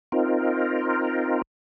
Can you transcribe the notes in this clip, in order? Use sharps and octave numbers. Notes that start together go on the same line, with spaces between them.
C4 D#4 F4 A#4